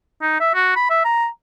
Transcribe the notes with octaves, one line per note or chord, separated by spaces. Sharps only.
D#4
E5
F#4
B5
E5
A#5